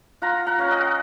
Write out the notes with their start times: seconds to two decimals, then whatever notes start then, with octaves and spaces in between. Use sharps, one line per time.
0.22 F4 F#5 A#5
0.46 F#5 A#5
0.59 C#4 F5
0.71 D#5 F#5